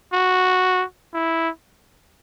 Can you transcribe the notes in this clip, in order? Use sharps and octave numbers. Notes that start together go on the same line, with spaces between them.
F#4
E4